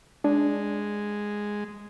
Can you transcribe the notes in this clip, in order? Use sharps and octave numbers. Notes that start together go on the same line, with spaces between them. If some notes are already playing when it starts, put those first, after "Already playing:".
G#3 D4